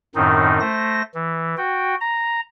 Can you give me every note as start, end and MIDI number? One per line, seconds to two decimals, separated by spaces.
0.15 0.60 42
0.15 0.60 45
0.15 0.60 51
0.15 0.60 60
0.15 0.60 63
0.60 1.02 57
0.60 1.02 72
0.60 1.02 94
1.14 1.55 52
1.57 1.95 66
1.57 1.95 79
2.01 2.41 82